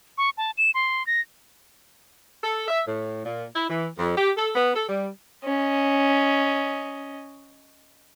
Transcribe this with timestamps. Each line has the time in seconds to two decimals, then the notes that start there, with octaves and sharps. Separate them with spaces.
0.18 C#6
0.38 A5
0.58 E7
0.74 C6
1.07 A#6
2.42 A4
2.68 E5
2.87 A2
3.25 A#2
3.55 E4
3.70 E3
3.98 F2
4.17 G4
4.37 A4
4.55 B3
4.75 A4
4.88 G3
5.44 C#4 D#5